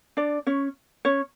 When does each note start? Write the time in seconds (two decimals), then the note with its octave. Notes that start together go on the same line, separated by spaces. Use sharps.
0.17 D4 D5
0.47 C#4 C#5
1.05 C#4 C#5